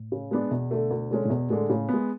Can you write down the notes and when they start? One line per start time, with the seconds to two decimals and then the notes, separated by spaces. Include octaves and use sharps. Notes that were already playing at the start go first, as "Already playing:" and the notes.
Already playing: A2
0.12 C#3
0.31 G#3 B3 D4
0.51 E2 B2
0.71 D3 A3
0.91 D2
1.11 D3 G#3 C#4
1.25 A2
1.30 E2 B2
1.50 A2 D3 G#3
1.69 A2 C#3
1.89 G#3 B3